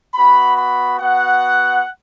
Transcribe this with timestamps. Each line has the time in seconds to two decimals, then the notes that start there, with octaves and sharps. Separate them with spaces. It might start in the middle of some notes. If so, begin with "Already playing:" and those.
0.15 B3 F#4 B5
0.58 B5
0.99 B3 F#4 F#5